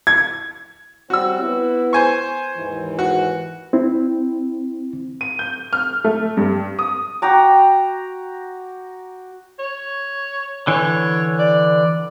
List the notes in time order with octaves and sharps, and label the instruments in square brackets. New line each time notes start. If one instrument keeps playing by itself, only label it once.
[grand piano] G#6
[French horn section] G3 C4 C#4 [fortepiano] F#4 E6
[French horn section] B3 E4
[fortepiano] C5 G#5 C#6
[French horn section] D#2 G#2 E3
[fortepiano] F#4
[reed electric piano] C4 E4
[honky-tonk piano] D#7
G6
F6
A3
G2
D#6
[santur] F#4 G5 A#5 D6
[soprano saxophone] C#5
[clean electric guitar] D3 E3 [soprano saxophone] C#5
[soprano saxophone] D5